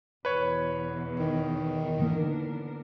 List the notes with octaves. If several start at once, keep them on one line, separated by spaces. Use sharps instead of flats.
E2 B2 E3 B4 C#5
D#3
D3 E3 A#3 B3 D4 A#4